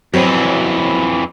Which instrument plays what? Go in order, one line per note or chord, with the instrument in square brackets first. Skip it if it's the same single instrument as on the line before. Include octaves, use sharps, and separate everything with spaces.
[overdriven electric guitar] F2 E3 [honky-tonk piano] F#3 C4